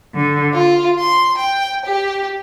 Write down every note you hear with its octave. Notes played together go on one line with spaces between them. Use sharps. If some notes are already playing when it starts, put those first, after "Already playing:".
D3
F4
C6
G5
G4